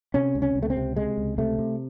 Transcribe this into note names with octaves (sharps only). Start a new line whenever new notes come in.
C3 C#4
C#2
C#4
C#2
A3
C4
C3
C3 G#3
C#2
C3 A3
C3